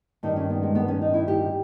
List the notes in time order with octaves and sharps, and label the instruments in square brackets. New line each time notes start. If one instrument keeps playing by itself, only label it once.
[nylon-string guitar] G2 D#3 D#4
C#4
B3
G#3
B3
C#4
D#4
E4
G4